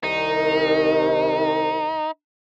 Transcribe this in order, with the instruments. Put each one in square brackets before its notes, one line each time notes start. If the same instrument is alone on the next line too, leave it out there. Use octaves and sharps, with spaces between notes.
[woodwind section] C2 D#3 [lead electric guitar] D#4